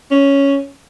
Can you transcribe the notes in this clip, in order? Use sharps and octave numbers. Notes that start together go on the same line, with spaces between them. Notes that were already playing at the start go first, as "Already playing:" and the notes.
C#4